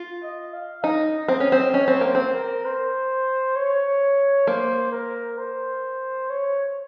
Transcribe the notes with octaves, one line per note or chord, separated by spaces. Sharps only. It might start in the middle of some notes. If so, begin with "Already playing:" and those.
Already playing: F4
D#5
F5
D#4 D#5
C4
C#4
C4
C#4 C#5
C4
A#3 C5
C4
A#4
C5
C#5
A#3 C5
A#4
C5
C#5